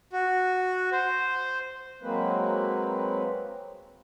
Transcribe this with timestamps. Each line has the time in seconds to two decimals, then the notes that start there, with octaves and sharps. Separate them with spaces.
0.12 F#4
0.92 C5
2.02 F#3 G#3 A#3 C4 B4